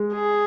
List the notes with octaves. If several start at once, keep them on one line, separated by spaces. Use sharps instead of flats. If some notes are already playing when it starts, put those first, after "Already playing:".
Already playing: G#3
G#4